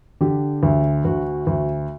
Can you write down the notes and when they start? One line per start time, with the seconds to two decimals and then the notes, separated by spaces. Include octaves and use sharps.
0.21 D3 G4
0.63 D2
1.05 D2 F#4
1.47 D2